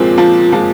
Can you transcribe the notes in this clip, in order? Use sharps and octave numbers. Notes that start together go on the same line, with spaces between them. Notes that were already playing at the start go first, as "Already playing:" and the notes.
Already playing: A#2 F3 G#3 A#3 C4
F3
F3 G#3